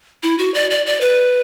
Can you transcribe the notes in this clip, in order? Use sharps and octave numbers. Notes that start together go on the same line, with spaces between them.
E4
F#4
D5
D5
D5
B4